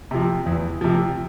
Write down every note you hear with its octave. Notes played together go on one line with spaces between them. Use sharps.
C3 F3
E2
C3 F3